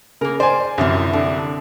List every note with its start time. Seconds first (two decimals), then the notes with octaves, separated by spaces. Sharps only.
0.21 C#3 A#3 A#4
0.40 C5 D5 G#5
0.78 C2 F#2 D3 E3 F3
1.13 D3 D4